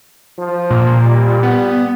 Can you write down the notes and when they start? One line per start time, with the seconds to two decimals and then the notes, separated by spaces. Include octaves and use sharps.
0.39 F3
0.70 A#2
1.05 G3
1.43 B3